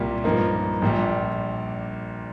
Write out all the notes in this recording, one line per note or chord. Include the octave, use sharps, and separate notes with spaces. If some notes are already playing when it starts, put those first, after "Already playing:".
Already playing: C2 A#2 G3
G2 F3 A#3 D#4
A#1 A#2 G3